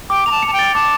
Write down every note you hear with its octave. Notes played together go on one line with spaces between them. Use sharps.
G5 D6
A#5 F7
A5
A5 C#7
G5
A6
A5 D6